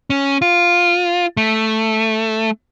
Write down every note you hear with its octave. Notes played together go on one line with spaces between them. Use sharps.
C#4
F4
A3